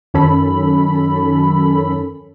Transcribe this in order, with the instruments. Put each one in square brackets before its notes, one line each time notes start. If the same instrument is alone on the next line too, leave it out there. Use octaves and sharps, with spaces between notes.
[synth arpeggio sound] F#2 D#3 C#4 A4 B5